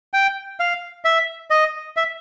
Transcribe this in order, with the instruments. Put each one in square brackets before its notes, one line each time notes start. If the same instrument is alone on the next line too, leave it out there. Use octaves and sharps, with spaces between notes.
[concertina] G5
F5
E5
D#5
E5